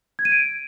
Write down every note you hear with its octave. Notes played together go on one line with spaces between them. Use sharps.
G#6
D#7
D7